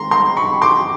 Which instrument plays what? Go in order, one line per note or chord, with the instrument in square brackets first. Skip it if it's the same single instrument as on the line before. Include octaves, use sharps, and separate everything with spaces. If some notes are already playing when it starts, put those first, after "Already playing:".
Already playing: [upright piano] D#3 G#3 A#5 C6
A#5 C6
B5 C#6
C6 D6